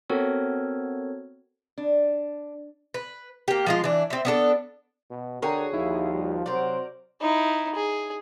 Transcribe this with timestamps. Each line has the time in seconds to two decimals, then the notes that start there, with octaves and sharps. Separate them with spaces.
0.10 B3 C4 F#4 A4 A#4 C#5
1.78 D4
2.94 B4
3.48 A#3 G4
3.66 F3 G#3 F4
3.84 E3 D4
4.10 C4 E5
4.25 B3 D4 A4
5.11 B2
5.42 D3 F#4 G#4 A#4 C#5 G5 A#5
5.74 D#2 F3 D#4 E4
6.14 G3
6.46 C3 F#3 F#4 A#4 C5 D5
7.21 D#4 E4
7.75 G#4